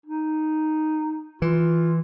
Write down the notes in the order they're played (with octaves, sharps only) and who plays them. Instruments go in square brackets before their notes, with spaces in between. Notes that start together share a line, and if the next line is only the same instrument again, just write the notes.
[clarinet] D#4
[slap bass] E3 [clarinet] F4